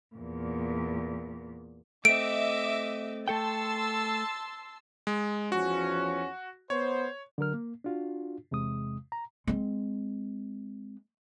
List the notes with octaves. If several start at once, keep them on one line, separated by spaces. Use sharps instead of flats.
E2 A#2
A3 C4 D#5 E5 D6 D7
A3 A4 G5 A5 C6 E6
G#3
E2 F3 C#4 F#4
B3 C5 C#5
D3 F#3 A#4 F6
A#3
D4 F4 F#4
E2 C3 G#3 D#6
A#5
G#3 C4